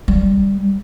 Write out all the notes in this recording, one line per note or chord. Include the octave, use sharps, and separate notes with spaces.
G3